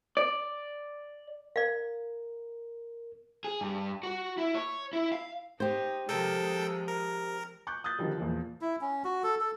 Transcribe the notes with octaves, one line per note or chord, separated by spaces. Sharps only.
D5
A#4 D5 F5
G#4
G2
F#4
E4
C#5
E4
F5
D#4 G4 C5
C3 D#3 F3 G#3 A4 G5
A#4
C#6 D6 F#6 G6
D#6 F#6 G6 A6
D3 D#3 F3 G3
E2 A#2 F3
E4
C#4
F#4
A4
A4